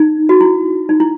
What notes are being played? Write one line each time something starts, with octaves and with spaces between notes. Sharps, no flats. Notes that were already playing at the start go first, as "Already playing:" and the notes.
Already playing: D#4
F#4
E4
D#4
E4